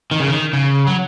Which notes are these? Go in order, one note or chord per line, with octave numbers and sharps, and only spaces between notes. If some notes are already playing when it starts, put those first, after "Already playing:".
D#3
C#3
D#3
C#3
F#3